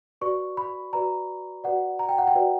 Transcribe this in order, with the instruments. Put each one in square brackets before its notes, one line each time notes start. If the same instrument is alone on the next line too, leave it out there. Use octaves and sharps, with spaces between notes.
[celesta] F#4 B4 D5 C#6
B5
F#4 B4 D5 A#5
F#4 B4 D5 F#5
A#5
G5
F#5
G5
F#4 B4 D5